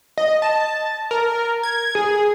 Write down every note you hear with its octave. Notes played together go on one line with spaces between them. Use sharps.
D#5
A5
A#4
G#6
G#4